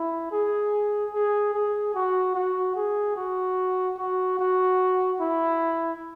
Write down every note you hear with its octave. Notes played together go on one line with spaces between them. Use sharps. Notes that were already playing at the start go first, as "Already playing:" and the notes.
Already playing: E4
G#4
G#4
G#4
F#4
F#4
G#4
F#4
F#4
F#4
E4